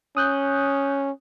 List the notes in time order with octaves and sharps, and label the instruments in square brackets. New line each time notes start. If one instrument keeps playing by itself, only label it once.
[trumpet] C#4 [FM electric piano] D#6 F#6 G6